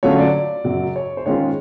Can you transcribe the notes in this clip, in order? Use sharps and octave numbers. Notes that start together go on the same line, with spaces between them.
D3 F#3 A3 C#4 F4 C#5
D5
F#2 C#3 F#3
C#5
C5
D#3 G#3 C#4 F4 C#5